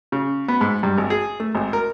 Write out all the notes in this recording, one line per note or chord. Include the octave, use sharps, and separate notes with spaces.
C#3
B3
G#2
G2
G#1
G#4
A3
G#1
A#4